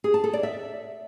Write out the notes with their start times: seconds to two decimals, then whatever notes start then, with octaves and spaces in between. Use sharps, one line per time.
0.04 G#4
0.14 A5
0.24 A4
0.33 D5
0.43 E5